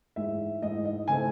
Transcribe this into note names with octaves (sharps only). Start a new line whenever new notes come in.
G#2 E3 G#3 E5
G#2 E3 G#3 D#5
D#5
C#3 E3 A3 C4 G#5